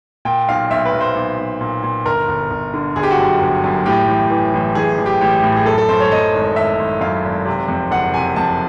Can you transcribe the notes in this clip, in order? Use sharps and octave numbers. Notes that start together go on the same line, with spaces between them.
A#2 G5
B1 F5
B1 E5
B4
B1
C5
B1
B1
A#2
A#2
G1 A#4
G1
G1
D3
G1 G#4
G4
F#4
F#2 G4
G1
F#2
A2 G4
A1
E3
A1
A1 G#4
A1
G4
A1 G4
A2
G#4
F#2 A4
A4
F#2 C5
C#5
F#2 D#5
G#1
G#1 E5
G#1
F#2 F5
G#1
C3
F2
F#1 F#5
C3 G#5
F2 A5